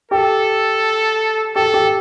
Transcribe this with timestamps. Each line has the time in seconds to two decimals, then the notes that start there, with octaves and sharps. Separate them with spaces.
0.11 G4 A4
1.56 G4 A4
1.74 G4